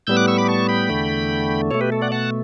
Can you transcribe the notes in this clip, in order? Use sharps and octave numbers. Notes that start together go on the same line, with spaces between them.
A2 G3 B3 E6 G6
D6 F#6
C#6 E6
B5 D6
A5 C#6
G5 B5
E2 D3 A3
B2 A3 A4 C#5
G4 B4
A4
D5 F#5
F#5 A5